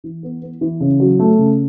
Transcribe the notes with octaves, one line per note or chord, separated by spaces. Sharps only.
E3
B3
B3
E3
C#3
F#3
A3
C#3